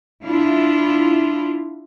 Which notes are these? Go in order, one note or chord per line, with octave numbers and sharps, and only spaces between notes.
D4 E4 F4